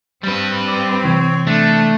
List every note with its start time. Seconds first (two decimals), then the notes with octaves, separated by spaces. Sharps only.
0.23 G3 C4 B4
0.68 D5
1.04 C3 E3 C#5
1.47 A3 D4